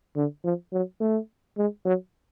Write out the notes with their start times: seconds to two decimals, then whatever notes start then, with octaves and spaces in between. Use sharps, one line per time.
0.16 D3
0.44 F3
0.73 F#3
1.00 A3
1.58 G#3
1.85 F#3